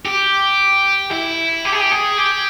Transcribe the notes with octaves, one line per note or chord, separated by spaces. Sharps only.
G4
E4
G4
G#4
G4
G#4
G4